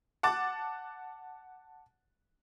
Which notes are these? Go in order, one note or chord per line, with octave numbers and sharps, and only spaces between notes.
F#5 A5 D6 A6